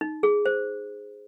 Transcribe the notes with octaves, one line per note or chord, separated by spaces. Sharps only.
D#4
G#4
C5